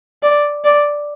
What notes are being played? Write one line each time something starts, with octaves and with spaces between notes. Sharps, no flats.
D5
D5